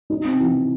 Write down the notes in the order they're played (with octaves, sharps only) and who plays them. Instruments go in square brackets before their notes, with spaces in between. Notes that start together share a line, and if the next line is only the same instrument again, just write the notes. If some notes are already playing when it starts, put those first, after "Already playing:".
[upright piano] D#4
C4
E3